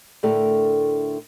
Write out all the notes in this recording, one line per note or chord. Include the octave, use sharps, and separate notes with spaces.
A2 D3 A3 A#4